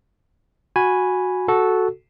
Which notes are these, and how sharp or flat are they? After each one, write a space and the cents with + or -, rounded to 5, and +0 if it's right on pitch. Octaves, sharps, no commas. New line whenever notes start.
F#4 -10 G#5 +0 B5 +0
F#4 +0 A4 -10